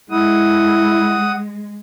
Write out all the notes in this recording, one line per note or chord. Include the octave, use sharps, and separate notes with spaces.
G#3 E4 F#5 D#6